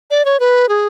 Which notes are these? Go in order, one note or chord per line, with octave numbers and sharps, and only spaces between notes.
D5
C#5
B4
G#4